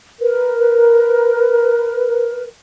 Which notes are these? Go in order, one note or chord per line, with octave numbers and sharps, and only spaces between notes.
A#4 B4